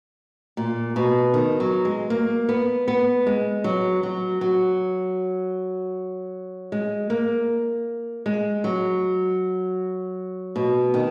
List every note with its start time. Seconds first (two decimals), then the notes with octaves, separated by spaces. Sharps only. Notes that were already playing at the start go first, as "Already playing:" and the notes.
0.57 A#2
0.96 B2
1.34 D#3
1.60 F#3
1.85 G#3
2.10 A#3
2.49 B3
2.88 B3
3.26 G#3
3.64 F#3
4.03 F#3
4.41 F#3
6.72 G#3
7.10 A#3
8.26 G#3
8.64 F#3
10.56 B2
10.94 D#3